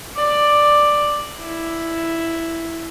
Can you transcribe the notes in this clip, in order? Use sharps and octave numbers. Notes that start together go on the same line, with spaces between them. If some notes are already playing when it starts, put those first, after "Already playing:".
D5
E4